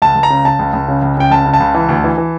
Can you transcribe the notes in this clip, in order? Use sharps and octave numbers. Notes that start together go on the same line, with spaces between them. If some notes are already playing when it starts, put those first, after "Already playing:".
C#2 A5
C#2
A#5
C#3
C#3 A5
C#2
C#2
C#3
C#2
C#3 G5
C#2 A5
C#3
A5
C#2
E3
D2
E3
E3